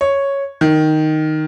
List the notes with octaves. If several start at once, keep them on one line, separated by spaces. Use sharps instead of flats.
C#5
D#3